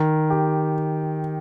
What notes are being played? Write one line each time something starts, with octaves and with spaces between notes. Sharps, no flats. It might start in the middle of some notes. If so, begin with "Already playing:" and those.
Already playing: D#3
G4